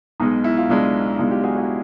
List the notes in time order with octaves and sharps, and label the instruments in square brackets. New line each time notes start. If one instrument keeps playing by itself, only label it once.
[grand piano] B1 B2 G#3 D#4
E4
F4
B1 B2 G#3 D4 E4
B1 B2 G#3 D#4 F4
F4 G4
F#4 G#4
E4 F#4